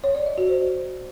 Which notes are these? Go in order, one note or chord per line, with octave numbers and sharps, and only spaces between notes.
C#5
D5
D#5
F#4
C5